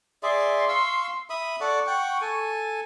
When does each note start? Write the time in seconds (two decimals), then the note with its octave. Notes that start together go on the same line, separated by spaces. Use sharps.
0.23 G#4 D5 E5 C6
0.69 F5 C#6 E6
1.30 E5 B5 D#6
1.60 A4 D5 F#5 C#6
1.86 F#5 G5
2.21 A4 G#5